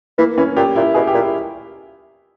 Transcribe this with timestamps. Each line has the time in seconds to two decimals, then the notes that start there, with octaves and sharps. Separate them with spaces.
0.18 E3 A#3
0.38 E3 C#4
0.57 A#2 G4
0.76 A#2 E4
0.94 B2 G#4
1.07 G4
1.14 A#2
1.20 E4